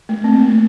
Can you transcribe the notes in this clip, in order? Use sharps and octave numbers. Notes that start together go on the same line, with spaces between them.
A3
C4
A#3
A3
A#3